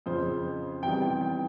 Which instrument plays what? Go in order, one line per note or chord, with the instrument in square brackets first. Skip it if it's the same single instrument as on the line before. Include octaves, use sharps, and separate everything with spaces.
[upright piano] F2 C#3 F3 C5
E2 C3 E3 G3 G5
G5
G5